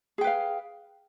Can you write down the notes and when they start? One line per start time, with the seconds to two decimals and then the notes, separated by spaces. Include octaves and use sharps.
0.18 G#4
0.21 G5
0.24 B4
0.27 F5